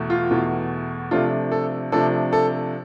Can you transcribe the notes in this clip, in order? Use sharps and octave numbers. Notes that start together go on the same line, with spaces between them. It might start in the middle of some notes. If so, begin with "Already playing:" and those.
Already playing: E2 B2 A3
F4
E2 B2 A3
C3 F3 A3 D4 F4
A4
C3 F3 A3 D4 A4
A4